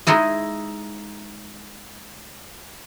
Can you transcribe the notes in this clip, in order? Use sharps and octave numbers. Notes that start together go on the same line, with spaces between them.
G#3 D#4 E4 G#4